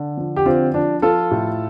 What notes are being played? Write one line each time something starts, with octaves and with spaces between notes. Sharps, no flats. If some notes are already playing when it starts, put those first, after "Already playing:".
Already playing: D3
F3
G4
D3 C4 F4
F3 D4
F3 F4 A4
A2